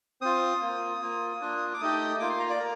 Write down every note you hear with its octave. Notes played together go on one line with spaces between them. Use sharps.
C4 F4 D#6
A#3 F4
A#3 F4
A#3 D4 F4
D6
A3 D#4 G4 D#6
A#3 F4 D6
C6
A#5
D5
A#4